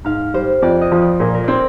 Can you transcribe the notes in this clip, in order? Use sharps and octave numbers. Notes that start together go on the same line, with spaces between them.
G#2 F5
G3 C5
F2 D5
D#5
F3
D5
A#2 A#4
A#4
C4 C5 D5